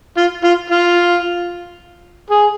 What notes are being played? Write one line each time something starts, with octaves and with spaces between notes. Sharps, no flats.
F4
F4
F4
G#4